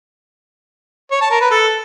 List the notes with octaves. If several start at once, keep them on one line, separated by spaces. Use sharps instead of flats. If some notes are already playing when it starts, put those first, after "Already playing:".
C#5
A5
A#4
B4
A4